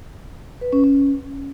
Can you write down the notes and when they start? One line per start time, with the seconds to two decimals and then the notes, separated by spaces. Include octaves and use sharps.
0.61 B4
0.73 C#4
0.84 C#4